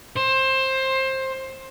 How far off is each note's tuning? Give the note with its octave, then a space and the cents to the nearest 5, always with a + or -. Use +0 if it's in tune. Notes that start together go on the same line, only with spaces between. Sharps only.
C5 +20